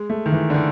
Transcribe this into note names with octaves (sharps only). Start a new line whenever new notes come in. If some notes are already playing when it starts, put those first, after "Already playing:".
Already playing: G#3
A3
D#3
E3
D3
D#3